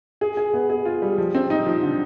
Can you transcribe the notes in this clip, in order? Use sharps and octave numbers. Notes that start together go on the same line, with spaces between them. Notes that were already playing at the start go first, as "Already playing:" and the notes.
G#4
G#4
B3
G#4
F4
G3
F3
C4
D#4
F3
D3